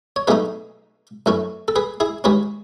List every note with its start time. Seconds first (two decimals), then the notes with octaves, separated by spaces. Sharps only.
0.16 C#5
0.27 B1 B2 A3 D#4 G#4 B4
1.26 F#2 E3 A3 C#4
1.68 A4
1.76 G#4 B4
2.00 E4 G#4
2.24 D#2 D#3 G#3 C#4 G#4 B4